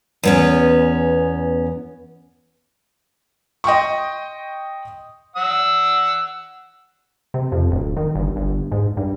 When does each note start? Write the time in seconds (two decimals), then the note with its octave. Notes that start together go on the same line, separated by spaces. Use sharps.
0.23 E2 B3 C#4
3.64 D#5 G5 C6 C#6
5.36 F#5 E6
7.34 C3
7.52 F2
7.71 D1
7.97 D#3
8.15 G1
8.36 G1
8.72 G#2
8.97 G2